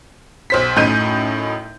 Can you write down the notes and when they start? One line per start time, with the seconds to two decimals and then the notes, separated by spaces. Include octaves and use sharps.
0.50 B1 C5 B6
0.76 F#2 A2 D#4 G6 D#7